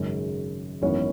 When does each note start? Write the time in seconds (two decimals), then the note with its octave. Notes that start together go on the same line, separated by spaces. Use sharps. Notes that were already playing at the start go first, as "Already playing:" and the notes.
Already playing: G#1 F#2 C#3 G#3
0.82 G#1 F#2 E3 B3 C#4